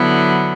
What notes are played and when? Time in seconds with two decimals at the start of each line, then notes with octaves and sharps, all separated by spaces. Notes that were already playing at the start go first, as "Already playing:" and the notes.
Already playing: D3 F#3 B3 E4